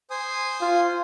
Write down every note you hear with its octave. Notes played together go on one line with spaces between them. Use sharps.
C5 G#5 D#6
F4